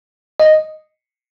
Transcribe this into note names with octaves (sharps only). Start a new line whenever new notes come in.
D#5